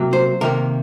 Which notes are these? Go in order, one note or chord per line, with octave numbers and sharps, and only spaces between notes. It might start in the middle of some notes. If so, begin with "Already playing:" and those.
Already playing: C3 F#3 A#3
C5
C3 D#3 A#3 A#4